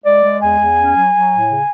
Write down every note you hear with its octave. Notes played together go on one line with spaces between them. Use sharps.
G#3 D5
G#3
E2 G#5
E2
C#4
F#3
F#3
A2
C#3